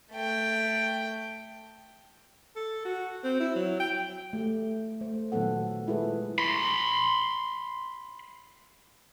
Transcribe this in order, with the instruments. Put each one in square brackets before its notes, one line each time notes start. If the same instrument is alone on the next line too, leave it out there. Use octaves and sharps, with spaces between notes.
[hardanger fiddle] A3 G5
[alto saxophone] A4
F#4
C4
E4
F#3
G5
[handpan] A3 G4
A3 C5
A#2 D#3 F#3 B3 A4 F#5
G#3 E4 F4 G#4 A4 B4
[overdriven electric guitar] B5 C6